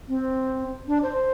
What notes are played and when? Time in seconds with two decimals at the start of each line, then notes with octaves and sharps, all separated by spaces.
0.08 C4
0.88 D4
1.03 C5